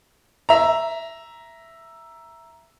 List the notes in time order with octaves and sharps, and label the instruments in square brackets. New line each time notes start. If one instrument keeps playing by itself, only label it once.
[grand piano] E5 A#5